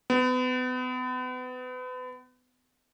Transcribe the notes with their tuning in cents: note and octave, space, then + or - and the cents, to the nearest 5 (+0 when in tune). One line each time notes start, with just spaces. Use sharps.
B3 +35